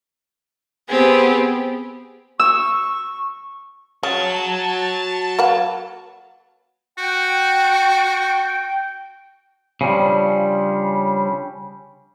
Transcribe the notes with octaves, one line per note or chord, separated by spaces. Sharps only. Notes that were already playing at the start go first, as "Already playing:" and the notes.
B3 C4 G4 G#4
C#6 E6
C#3 F#4 C#5 A5
A#3 B4 F#5
F#4 G5
C#3 F3 G3 D4